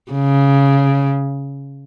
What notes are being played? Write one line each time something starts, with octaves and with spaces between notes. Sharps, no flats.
C#3